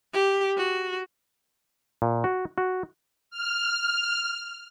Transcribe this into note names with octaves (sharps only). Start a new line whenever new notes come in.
G4
F#4
A#2
F#4
F#4
F6